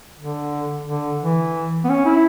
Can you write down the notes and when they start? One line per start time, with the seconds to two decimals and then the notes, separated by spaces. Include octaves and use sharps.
0.20 D3
0.87 D3
1.22 E3
1.84 B3
1.89 C#4
2.05 E4